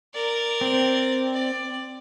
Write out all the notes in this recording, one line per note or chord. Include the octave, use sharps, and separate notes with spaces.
A#4 D5
C4
D5